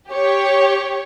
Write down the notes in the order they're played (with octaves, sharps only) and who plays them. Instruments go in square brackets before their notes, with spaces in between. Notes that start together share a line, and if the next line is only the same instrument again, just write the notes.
[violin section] G4 C#5